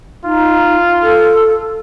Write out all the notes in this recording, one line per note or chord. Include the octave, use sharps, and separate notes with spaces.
D#4 F4
A4